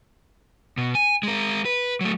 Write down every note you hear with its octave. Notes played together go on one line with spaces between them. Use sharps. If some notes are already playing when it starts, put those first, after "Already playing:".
B2
G#5
G#3 A#4
B4
F#3 A3